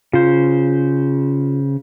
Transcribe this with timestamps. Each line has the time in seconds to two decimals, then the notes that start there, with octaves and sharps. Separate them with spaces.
0.13 C#3 F4 C5